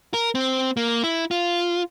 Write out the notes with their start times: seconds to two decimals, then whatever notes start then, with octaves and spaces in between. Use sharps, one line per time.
0.14 A#4
0.35 C4
0.77 A#3
1.04 E4
1.31 F4